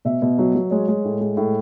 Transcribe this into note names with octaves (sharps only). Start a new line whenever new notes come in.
B2 E5
B2
F#3
F#3
G#3 C#5
G#3
A2
G#3
A2